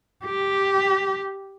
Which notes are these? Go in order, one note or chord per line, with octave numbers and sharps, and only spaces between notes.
G4